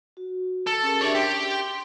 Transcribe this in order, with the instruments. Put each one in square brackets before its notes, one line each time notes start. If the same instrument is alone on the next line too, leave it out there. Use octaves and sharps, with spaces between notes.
[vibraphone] F#4
[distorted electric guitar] A4
[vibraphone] C#4 G#4 A#4
[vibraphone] D4 G4 E5 [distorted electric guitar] C#5 D5
[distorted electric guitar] G4 [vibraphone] C6